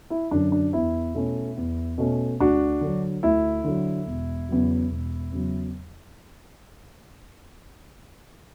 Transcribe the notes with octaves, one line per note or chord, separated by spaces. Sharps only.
E4
F#2 D3 F#3 D4
D4
E2 E4
B2 A3 C#4
E2
B2 A3 C#4
D2 D4 F#4
D3 F#3
D2 E4
D3 F#3
E1
E2 C#3 F#3
E1
E2 C#3 F#3